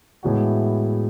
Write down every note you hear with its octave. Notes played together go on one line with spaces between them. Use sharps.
A2 E3 G#3 B3 F#4